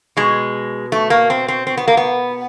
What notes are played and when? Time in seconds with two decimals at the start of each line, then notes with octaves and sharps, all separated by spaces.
0.17 B2 G#3
0.92 A3
1.10 A#3
1.30 C4
1.48 C4
1.67 C4
1.77 B3
1.88 A#3
1.97 B3